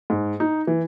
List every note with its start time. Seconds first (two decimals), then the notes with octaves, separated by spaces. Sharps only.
0.10 G#2
0.40 D#4
0.67 E3